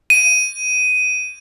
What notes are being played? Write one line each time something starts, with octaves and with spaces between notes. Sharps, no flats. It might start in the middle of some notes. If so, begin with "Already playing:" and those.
D#7